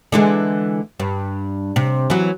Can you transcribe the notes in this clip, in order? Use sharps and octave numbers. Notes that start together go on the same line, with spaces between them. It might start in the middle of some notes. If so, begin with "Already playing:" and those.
D3 E3 G#3
G2
C3
E3 F#3